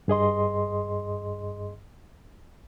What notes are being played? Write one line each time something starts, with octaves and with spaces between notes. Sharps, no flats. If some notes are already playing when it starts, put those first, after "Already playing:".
G2 G#4 D#5 C6